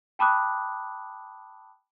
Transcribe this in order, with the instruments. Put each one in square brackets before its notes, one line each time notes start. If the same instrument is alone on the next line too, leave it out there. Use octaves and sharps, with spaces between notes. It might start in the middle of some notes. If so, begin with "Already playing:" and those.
[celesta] G5 A5 B5 D6 D#6 F#6